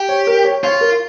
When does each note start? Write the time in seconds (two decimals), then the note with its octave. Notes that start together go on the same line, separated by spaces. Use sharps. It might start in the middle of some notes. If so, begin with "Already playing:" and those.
Already playing: G4
0.09 C#5
0.27 A#4
0.45 C#5
0.64 F4 C#5
0.81 A#4